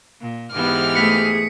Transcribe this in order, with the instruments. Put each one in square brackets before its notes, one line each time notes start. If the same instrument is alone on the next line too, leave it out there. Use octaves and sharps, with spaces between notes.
[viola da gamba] A#2
[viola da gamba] G#2 E3 B3 [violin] G4 F6
[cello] A3 G#4 [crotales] B6 C#7